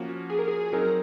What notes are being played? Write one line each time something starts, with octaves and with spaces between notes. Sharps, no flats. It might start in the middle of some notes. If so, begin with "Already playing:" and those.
Already playing: F3 A#3 C#4 F#4
G#4
A#4
G#4
F#3 C4 D#4 G#4 A#4